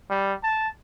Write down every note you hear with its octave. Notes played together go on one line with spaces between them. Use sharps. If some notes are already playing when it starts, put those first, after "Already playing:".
G3
A5